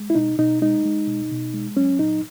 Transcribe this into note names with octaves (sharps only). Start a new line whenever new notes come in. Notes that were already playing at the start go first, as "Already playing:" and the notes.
Already playing: G#3
E4
B2 D#4
B2 D#4
G#3 D#4
G#3
B2
B2
G#3
F#3 C#4
A#2 D#4